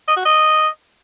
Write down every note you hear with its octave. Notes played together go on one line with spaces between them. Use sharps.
D#5
F#4
D#5